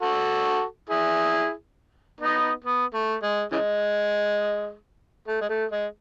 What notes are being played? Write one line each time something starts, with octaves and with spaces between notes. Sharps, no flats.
F#4 A4
E4 G#4
B3 D#4
B3
A3
G#3
C#3 E3 G#3
A3
G#3
A3
G#3